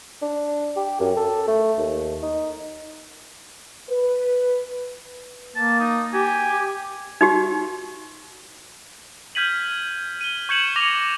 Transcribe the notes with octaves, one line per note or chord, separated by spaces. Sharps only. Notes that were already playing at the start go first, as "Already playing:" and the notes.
D4
G4
F#2
A4
A3
D#2
D#4
B4
A#3 A5
D#4
G4 G#5
D#4 F#4 G4
F6 G6 G#6 B6 D#7 F#7
D#7 G7
C#6 G6 G#6 C#7 E7 F#7
D6 A#6 F7